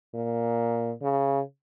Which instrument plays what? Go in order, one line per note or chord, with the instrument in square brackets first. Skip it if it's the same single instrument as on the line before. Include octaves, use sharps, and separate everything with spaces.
[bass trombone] A#2
C#3